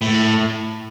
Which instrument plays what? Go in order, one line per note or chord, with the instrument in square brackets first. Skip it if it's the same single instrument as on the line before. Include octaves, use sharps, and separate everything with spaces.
[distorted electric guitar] A2